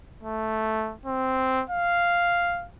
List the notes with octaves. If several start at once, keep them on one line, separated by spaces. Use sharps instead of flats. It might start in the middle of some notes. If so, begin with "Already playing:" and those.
A3
C4
F5